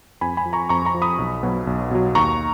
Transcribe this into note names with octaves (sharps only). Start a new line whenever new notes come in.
F2 G#5 B5
G#5 B5
F3
A#5 C#6
F2 A#5 C#6
A#5 C#6
F3
B5 D#6
B1
B2 F#3
B1
B2 F#3
D#2 A#5 C#6